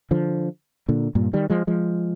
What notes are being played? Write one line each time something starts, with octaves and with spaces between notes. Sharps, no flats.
D3 F3
A#2 D3
G2 A#2
D#3 G3
F3 G#3
F3 G#3